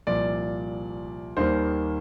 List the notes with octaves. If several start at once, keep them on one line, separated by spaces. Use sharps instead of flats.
C2 A#2 F3 D5
D#2 D#3 G3 A#3 C5